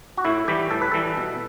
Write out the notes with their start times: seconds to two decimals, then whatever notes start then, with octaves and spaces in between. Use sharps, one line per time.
0.17 F#4
0.25 A2 E4
0.48 E3 G3 G4
0.71 A2 A4
0.82 B4
0.92 E3 G3 A4
1.17 B2